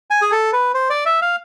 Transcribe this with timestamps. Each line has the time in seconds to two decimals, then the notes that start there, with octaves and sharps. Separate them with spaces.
0.10 G#5
0.22 G#4
0.32 A4
0.53 B4
0.74 C5
0.90 D5
1.06 E5
1.22 F5